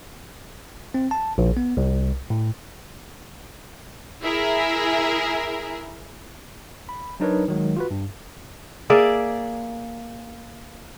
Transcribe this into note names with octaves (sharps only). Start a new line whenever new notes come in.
C4
A5
A#1
B3
C2
A2
E4 G#4 A#4 E5
B5
F#3 D4 D#4 A#4 B4 C#5
D#3 F#3 G#3
F4 F#4 B4
G2
A#3 G#4 D5 E5